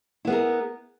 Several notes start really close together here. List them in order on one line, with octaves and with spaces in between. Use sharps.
E4 B3 G#4 A#4